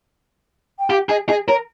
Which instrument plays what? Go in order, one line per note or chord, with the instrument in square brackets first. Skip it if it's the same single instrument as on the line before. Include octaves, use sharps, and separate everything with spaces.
[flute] G5
[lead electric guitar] G4 [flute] F5
[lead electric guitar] G#4 [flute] D#5
[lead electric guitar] G#4 [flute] D#5
[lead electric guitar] A#4 [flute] C#5